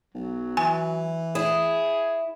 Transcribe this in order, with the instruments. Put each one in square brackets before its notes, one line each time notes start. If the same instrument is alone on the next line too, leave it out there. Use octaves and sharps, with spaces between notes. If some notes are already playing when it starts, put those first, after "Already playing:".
[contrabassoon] B1 [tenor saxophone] F#3
[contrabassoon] E3 [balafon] G#5
[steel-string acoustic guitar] E4 [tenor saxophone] G#4